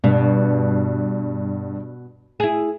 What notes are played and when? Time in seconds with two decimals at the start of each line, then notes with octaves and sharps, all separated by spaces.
0.04 G2 B2
2.40 E4 G#4